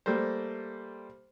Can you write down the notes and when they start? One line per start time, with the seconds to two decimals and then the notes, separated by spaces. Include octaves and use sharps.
0.06 G3 A3 A#3 C5